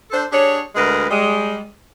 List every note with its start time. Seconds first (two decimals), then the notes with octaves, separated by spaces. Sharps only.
0.11 D4 A4 C5
0.32 D4 G4 G#4 C#5
0.75 D2 G#3 G#4 A#4 B4
1.10 G3 G#3